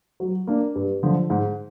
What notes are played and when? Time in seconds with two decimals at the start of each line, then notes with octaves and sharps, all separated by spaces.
0.20 F#3
0.47 A#3 D4
0.75 G2
1.03 D3 F3
1.30 G#2